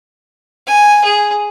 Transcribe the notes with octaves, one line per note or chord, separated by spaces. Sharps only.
G#5
G#4